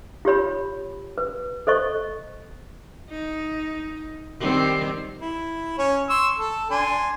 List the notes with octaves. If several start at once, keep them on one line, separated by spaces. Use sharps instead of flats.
F4 G4 C#5 B5
B4
A4 C5 D#5 C#6
D#4
D#3 G3 C4
E4
C#4 C#5
C6 C#6 E6
A4
D4 G#5 C6